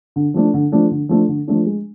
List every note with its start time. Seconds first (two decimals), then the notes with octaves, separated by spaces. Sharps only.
0.16 D3
0.34 F3 A3 D4
0.54 D3
0.72 F3 A3 D4
0.91 D3
1.09 F3 A3 D4
1.28 D3
1.48 F3 A3 D4
1.65 G#3